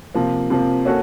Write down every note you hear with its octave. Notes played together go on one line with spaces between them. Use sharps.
C3 F3 A#3
C3 F3 A#3
A#3 C#4 F#4 A4